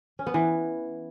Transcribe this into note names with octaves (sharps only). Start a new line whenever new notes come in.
C#4
B3
E3